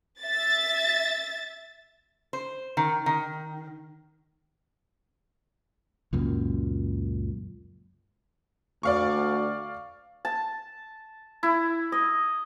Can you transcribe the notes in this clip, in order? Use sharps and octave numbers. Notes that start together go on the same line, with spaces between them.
E5 A6
C5
D#3
D#3
C#2 F#2 A#2
D2 D5 F5 C#6
A5
E4
D#5